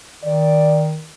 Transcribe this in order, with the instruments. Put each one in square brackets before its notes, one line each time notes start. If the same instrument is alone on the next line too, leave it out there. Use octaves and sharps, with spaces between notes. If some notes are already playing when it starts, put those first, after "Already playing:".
[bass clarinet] D#3 [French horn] D5